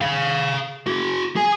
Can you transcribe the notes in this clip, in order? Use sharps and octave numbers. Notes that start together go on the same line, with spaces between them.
G#4 F5
F#4 G#4
G#4 G#5